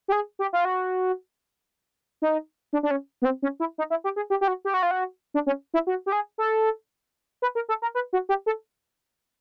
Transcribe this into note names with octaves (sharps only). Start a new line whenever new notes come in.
G4
G#4
G4
F4
F#4
D#4
D4
D4
C#4
B3
C4
C#4
E4
D#4
E4
G4
G#4
G4
G4
F#4
G4
F#4
F4
F#4
D4
C#4
E4
F#4
G4
G#4
A4
B4
A#4
A4
A#4
B4
F#4
G4
A4